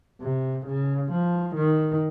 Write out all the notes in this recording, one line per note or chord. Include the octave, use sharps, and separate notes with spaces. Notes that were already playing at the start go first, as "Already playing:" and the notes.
C3
C#3
F3
D#3